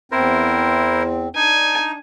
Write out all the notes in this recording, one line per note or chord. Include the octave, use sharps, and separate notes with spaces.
E2 C4 E4 A#4 C5
D4 D#4 G#5